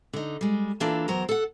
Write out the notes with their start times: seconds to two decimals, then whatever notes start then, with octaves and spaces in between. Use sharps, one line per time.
0.13 D3 D#4
0.41 G3 G#3
0.80 E3 A#3 D4 F4 A4
1.08 E2 F#3 A#4 C5 A#5
1.29 A4 F#5